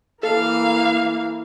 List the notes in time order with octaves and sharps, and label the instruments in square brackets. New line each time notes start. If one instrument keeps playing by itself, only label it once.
[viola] E3 A#3 [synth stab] A4 [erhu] F5